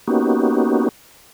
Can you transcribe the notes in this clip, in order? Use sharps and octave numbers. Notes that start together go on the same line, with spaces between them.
A#3 B3 C#4 D#4 F#4 G4